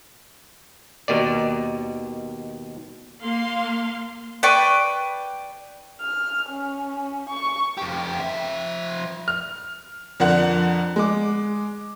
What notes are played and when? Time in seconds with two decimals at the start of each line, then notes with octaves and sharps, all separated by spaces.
1.08 D#2 B2 D#3 D5
3.22 A#3 F5 C6
4.43 B4 D5 G5 C#6
6.01 F6
6.50 C#4
7.30 C#6
7.77 F2 G4
8.19 F3 E5
9.28 F6
10.20 F2 D3 A#4 F#5 F#6
10.96 G#3 D6